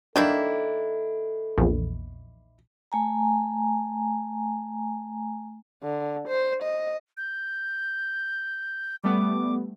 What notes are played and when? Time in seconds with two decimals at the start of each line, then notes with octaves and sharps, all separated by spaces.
0.16 D#3 A#3 D4 E4 A4
1.58 A#1 E2
2.92 A3 G#5 A#5
5.83 D3
6.28 C5
6.62 D#5
7.17 G6
9.04 G3 A3 B3 D6